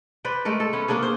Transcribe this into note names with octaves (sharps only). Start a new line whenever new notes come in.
B4 C5 D5
G#3 A3 A4 A#4
A4
B3 C#4
A#3 C#4 D4 G#4
C5